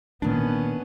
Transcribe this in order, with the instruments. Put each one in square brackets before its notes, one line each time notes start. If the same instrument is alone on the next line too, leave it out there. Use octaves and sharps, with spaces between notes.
[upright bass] A#2 A#3 [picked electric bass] D#3 D4 [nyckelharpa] B3 C#4